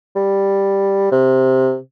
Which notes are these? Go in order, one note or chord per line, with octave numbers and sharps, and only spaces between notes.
G3
C3